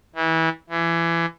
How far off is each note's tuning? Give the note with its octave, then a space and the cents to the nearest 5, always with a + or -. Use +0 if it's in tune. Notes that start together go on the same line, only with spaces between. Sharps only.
E3 -25
E3 +25